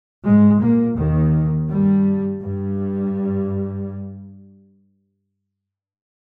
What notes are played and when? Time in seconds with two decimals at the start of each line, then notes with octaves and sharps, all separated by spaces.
0.24 G#2 G#3
0.60 A#2 A#3
0.96 D#2 D#3
1.69 G2 G3
2.41 G2 G3